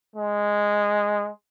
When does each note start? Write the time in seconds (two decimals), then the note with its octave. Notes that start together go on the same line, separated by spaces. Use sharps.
0.16 G#3